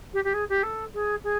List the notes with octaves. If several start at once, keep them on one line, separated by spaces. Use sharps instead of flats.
G4
G4
G#4
G4
A4
G#4
G#4